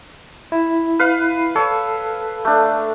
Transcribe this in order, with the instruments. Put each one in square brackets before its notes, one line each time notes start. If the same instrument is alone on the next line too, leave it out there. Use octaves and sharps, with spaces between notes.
[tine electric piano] E4
[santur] B4 F5
[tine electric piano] A4 [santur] C#5
[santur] A3 D4